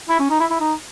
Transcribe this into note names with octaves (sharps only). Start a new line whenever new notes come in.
E4
C#4
D#4
E4
E4
D#4